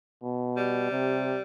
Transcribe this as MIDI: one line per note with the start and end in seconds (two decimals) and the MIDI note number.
0.23 0.88 47
0.57 1.42 55
0.92 1.38 48